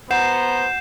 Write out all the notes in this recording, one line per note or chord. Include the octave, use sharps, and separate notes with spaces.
B3 C5 F#5 A#5 G6 C7 E7